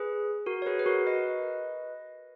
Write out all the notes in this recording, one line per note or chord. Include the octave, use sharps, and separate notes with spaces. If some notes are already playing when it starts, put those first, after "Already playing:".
Already playing: G#4 B4
F#4 A#4
C#5
G#4 B4
B4
F#4 A#4
B4 D#5